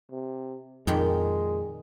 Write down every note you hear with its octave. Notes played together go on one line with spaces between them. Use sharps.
C3
F2 A#2 D#3 G#3 G5